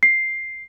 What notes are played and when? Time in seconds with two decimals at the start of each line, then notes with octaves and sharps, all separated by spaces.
0.03 C7